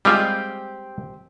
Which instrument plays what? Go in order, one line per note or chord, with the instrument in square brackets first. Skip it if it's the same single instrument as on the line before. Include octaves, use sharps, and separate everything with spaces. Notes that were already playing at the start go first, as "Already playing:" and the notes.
[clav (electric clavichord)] G3 G#3 F4 [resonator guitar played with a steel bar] C4 G4